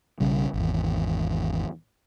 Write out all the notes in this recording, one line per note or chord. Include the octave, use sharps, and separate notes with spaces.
B1 C#3 G3
G#1 E2